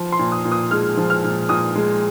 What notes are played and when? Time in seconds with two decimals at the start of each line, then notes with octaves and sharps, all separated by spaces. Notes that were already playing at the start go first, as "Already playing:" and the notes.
Already playing: F3
0.12 C6
0.19 A#2
0.32 D#6
0.45 A#2
0.52 D#6
0.71 G#3 F6
0.97 F3
1.10 F6
1.24 A#2
1.49 A#2 D#6
1.75 G#3